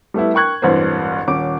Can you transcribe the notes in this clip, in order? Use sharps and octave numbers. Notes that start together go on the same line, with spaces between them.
G3 A3 B3 E4
A#4 G5 C#6 F#6 G#6
E1 A1 G2 C4 B4 C5
D#1 C#4 D6 D7